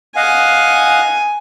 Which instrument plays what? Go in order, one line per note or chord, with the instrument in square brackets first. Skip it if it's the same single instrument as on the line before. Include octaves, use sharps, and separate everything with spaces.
[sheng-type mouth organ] D#5 F5 F#5 [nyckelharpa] G#5